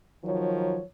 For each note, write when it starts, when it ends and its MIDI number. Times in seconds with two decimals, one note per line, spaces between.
0.24 0.81 51
0.24 0.81 53
0.24 0.81 54
0.24 0.81 73